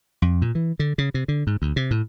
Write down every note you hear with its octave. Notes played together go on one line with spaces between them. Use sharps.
F2
A#2
E3
D3
C#3
C3
D3
G#2
D2
C3
A2